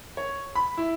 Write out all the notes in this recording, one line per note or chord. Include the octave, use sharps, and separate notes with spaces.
C#5
B5
E4